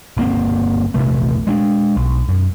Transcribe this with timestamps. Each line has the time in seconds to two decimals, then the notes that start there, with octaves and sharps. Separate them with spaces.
0.17 G1 A#3 C4
0.94 E1 A#1 C3 A3
1.47 G#3 C#4 D4
1.97 B1
2.29 F#2